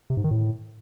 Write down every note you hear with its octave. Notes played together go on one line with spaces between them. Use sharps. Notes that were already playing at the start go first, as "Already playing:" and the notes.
C3
G#2
D#3
A2